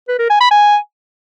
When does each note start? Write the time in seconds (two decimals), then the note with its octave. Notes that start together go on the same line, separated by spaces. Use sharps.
0.08 B4
0.19 A#4
0.30 G#5
0.40 B5
0.51 G#5